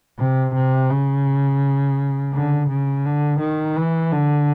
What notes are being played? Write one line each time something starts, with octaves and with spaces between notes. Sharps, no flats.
C3
C3
C#3
D3
C#3
D3
D#3
E3
D3